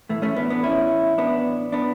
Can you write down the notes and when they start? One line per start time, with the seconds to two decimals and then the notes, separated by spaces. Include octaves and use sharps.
0.09 A2 E3 A3
0.22 A3 C#4
0.36 B3 D4
0.50 B3 D4
0.63 C#4 E4
1.18 B3 D4
1.72 B3 D4